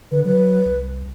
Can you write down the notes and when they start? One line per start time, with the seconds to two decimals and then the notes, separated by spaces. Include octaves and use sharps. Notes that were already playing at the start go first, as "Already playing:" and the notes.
0.11 D3 B4
0.25 F#3 B4
0.65 C2